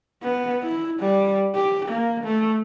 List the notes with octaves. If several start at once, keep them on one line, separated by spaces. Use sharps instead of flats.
B3
E4
G3
G4
A#3
A3